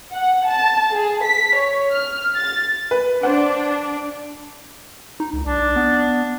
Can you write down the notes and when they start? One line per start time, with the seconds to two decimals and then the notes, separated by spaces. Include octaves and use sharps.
0.12 F#5
0.47 A5
0.92 G#4
1.24 B6
1.55 C#5
1.91 F6
2.37 A6
2.91 B4
3.23 D4 C5 F#5
5.20 D#4
5.33 C#2
5.46 B1 D4
5.76 B3